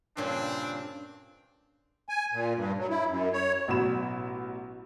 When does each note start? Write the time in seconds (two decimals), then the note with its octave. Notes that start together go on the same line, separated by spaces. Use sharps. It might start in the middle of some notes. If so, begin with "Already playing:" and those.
0.17 G2 A#2 C#3 C4 D4
2.09 G#5
2.33 A#2
2.55 G2
2.78 F#3
2.90 E4
3.09 F#2
3.33 C#5
3.68 A1 B2 F#3 B5 E7